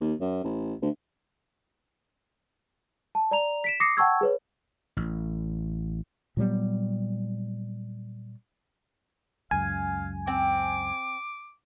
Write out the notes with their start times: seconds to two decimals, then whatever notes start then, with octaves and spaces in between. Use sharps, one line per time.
0.01 D#2
0.21 F#2
0.44 A1
0.82 D2
3.15 A5
3.31 D5 A#5 F7
3.64 B6 D7 E7
3.80 D6 D#6 A#6 C7 C#7
3.97 F#5 G5 A5 C#6 E6 G#6
4.21 G#4 B4 C#5
4.97 A1
6.37 A#2 F#3 G3 B3
9.51 C#2 F#2 F5 G#5
10.27 C4 D6